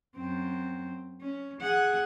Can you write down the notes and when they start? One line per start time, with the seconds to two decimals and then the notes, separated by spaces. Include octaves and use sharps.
0.16 F#2 C4
1.21 C#4
1.62 G#4 F#5